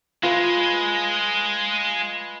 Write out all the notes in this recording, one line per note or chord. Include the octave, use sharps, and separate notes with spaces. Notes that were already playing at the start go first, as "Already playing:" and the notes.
G#3 F4 B4